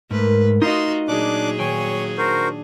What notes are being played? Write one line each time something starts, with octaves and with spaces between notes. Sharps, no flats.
G#2 A3 A#4 B4
D#4 F4 F#4 D#5 C6
A#2 F#3 D4 G#4 D6 F#6
D#1 C#5 G5 G#5
D4 F#4 A#4 C5